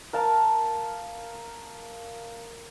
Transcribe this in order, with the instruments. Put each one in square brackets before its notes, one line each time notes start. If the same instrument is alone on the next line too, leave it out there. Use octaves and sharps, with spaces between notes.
[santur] A#4 F5 A5